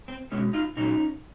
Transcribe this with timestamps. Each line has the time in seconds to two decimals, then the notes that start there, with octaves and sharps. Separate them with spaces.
0.08 C4
0.32 E2 B2 G#3 C#4
0.53 D#4 F4
0.77 A#2 F#3 A#3 C#4 D#4